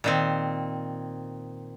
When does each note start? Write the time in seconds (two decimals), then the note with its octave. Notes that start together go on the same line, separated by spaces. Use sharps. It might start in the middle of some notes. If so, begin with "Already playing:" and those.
0.04 A#2 D#3 C4